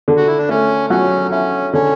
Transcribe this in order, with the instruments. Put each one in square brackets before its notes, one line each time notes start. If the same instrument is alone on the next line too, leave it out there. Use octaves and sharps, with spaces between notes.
[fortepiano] D3
[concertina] F#4
E4
D4
[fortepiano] A3 [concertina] C#4
[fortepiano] F#3 [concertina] C#4
[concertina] C#4 [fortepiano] E4
[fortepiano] D3 [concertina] C#4